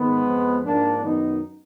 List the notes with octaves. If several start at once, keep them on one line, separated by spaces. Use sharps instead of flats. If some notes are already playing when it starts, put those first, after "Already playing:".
Already playing: G#2 D#3 G#3 B3
F2 F3
G#2 F3 A#3 D4
F#2 D#3 B3 D#4